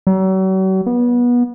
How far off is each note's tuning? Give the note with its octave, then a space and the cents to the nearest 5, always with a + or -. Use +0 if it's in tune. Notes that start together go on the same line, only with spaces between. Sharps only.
F#3 +40
B3 -25